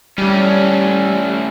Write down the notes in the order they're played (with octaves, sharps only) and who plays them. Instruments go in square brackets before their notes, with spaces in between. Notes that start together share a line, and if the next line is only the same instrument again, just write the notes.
[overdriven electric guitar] A2 C#4 [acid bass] G3